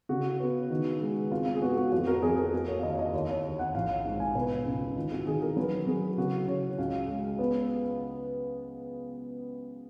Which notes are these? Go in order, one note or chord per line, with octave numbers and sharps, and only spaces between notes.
C#3 F#4
B3
D#3
G#3
G#1 F4
F4
G#4
B3 F#4
F#4
F2 F#4
A#4
F2 G#4
A#4
A#3
C#5
F5
D#2 D#5
D#5
D#2 C#5
C#5
D#2
F#5
A#1 F5
G#2
G#5
B2 B4
C#2
D#3 F4
F#4
D#3 G#4
A#4
F#3 B4
F#3 G#4
C#3 F#4
C#3 C#5
C#2 F5
G#3
B3